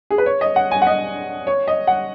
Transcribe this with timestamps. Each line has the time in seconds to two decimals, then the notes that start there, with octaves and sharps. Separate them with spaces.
0.10 G#4
0.18 B4
0.26 C#5
0.41 D#5
0.56 F#5
0.71 G#5
0.82 F#5
0.87 D#5
1.47 C#5
1.67 D#5
1.87 F#5